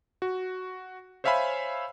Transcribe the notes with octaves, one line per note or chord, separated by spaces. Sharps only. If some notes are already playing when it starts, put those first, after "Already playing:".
F#4
C5 C#5 E5 F5 G#5 B5